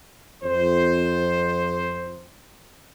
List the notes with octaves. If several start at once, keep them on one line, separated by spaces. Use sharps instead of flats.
F2 C5